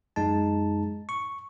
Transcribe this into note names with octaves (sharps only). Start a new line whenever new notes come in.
F#2 G#3 D#4 A5
C#6